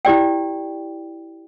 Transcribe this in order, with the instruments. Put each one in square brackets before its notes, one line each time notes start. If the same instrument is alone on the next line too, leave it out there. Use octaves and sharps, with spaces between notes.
[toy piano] E4 G4 D5 G5